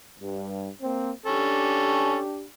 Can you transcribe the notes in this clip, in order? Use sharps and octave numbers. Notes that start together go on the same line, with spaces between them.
G2
A#3 C4
C#4 D4 G4 A4